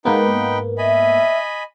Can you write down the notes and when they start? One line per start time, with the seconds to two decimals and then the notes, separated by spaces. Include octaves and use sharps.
0.05 G#2 A#3 B3 D#4 B4 G5
0.78 D#5 E5 G#5 B5